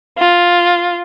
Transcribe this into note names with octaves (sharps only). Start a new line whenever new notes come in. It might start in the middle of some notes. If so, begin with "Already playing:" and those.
F4